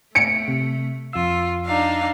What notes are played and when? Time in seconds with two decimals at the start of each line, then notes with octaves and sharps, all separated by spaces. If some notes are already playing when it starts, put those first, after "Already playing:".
0.15 A3 C#7 D7
0.48 C3
1.13 F2 F4 E6
1.65 D4 D#4 F5